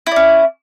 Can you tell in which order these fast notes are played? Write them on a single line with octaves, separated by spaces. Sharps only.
E4 D5 C#4